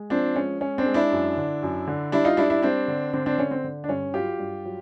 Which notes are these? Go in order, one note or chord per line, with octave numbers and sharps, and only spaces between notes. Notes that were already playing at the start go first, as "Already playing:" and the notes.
Already playing: G#3
F3 C4 D4
G#3 C#4
G#3 C#4
C4 D4
G#3
D4 E4
F#2
D3
F#2
D3
G3 D4 E4
D#4 F4
G3 D4 E4
D4 E4
G3 C4 D4
D3
D3 C4 D4
C4 D4
D3 C#4
C4
D3
D4
G2 C#4
F#3 F4 G4
G2
F#3